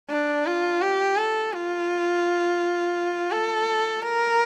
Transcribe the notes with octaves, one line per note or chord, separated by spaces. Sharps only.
D4
F4
G4
A4
F4
A4
A#4